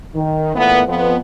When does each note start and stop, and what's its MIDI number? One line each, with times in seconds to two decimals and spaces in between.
0.14 0.52 51
0.55 0.82 46
0.55 0.82 52
0.55 0.82 57
0.55 0.82 59
0.87 1.16 41
0.87 1.16 53
0.87 1.16 59